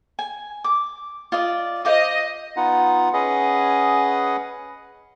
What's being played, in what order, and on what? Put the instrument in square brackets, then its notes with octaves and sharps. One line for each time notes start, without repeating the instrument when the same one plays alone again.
[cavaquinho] G#5
D6
F4 D5 D#5
[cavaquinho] C5 F5 D6 [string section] D#5
[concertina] B3 D#4 F4 F#5
C#4 G#4 B4 D#5 F#5